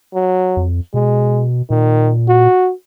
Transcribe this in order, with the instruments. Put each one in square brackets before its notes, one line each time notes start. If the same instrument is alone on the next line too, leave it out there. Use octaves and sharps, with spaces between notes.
[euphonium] F#3
[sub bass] F2
[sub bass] B2 [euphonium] G#3
[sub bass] A#2 [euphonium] D#3
[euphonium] F#4